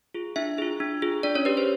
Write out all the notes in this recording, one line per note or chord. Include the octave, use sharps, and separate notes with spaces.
F4 G#4
D4 E4 E5
F4 G#4
D4
F4 G#4
D4 D5
C#4 C#5
G4 B4
C5